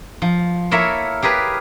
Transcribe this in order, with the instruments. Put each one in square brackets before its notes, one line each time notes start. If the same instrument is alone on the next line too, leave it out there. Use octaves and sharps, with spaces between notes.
[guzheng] F3
A#3 E4 A4 A#4 C#5 E5
G4 G#4 A#4 B4 G#5